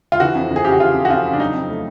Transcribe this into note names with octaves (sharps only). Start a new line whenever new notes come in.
F4
E3 F#4
F2
F2
G#4
C#3 G4
F#4
E3 F4
F2
F#4
F2 F4
C#3
D4
F#3 D#4
F2
A3